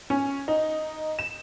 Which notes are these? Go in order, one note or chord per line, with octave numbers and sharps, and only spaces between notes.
C#4
D#4
E7